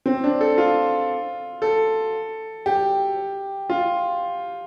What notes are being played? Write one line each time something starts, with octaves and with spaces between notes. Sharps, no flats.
C4
D4
A4
F4
A4
G4
F4